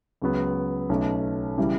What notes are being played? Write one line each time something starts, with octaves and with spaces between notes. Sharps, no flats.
C#2 C#3 F#3 B3
B1 B2 A3 C#4
C#3 E3 G3